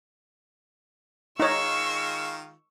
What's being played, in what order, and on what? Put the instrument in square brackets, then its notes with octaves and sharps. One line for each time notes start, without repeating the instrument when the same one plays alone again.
[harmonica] D#3 G#3 F4 [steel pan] D#4 C#5 [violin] C#6 E6